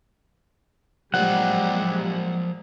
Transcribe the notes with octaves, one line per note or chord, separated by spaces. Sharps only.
F3 F#3 G#3 G4 C5 D5 F#5